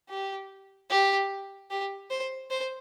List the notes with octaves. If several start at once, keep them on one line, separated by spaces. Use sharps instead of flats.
G4
G4
G4
C5
C5